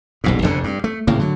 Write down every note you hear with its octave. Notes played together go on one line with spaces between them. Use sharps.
D#1 B1 G#2
F1 F2 B2 D3
G2
A3
G#1 A2 C#3 A#3
D3 F#3